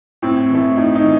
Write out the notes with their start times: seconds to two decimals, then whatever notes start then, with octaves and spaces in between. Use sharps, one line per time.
0.22 A2 C4
0.50 E3
0.55 A3
0.77 A2 D#4
0.95 D#4
1.04 E3